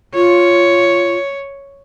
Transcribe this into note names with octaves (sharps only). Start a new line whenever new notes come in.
F4 C#5